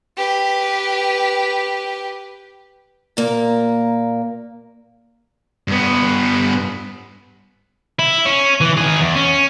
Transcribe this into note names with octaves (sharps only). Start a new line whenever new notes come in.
G4 B4
A#2 A#3 A#4
G2 B3
E4
C#4
E3
D#3 G#4
E2
C#4